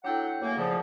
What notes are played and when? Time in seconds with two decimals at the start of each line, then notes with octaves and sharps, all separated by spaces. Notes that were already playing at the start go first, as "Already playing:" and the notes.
0.05 F#3 D4 E4 A4 F#5 G5
0.42 F#2 A3 A#3 F#5 G#5
0.58 A#2 C#3 F3